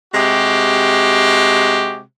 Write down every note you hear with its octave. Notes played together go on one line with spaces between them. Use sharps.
C3 G#3 F#4 G4